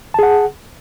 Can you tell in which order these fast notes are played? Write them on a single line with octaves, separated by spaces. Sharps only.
A5 G#4 F#5